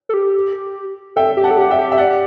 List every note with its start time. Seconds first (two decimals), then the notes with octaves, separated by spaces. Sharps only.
0.09 A4
0.14 G4
1.16 A4 E5 G5
1.37 G4
1.44 F#5 A5
1.51 A4
1.57 G4 F#5
1.71 E5 G5
1.78 G4
1.92 E5
1.98 D5 F#5